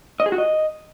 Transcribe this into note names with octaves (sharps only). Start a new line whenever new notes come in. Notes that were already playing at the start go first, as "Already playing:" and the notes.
D#5
G#4
F#4
D#5